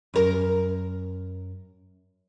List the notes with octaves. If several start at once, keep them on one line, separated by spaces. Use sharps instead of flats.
F#2 A#4